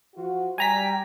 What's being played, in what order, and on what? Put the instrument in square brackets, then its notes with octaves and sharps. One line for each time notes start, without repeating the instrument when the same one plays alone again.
[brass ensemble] F3 F4 F#4
[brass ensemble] G3 [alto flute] G5 [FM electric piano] G#5 A#5 B6